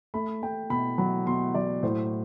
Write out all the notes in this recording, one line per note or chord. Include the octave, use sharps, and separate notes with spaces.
A3 B5
A3 G5
B2 B5
F#3 B5
B2 C6
F#3 D5
A2 C5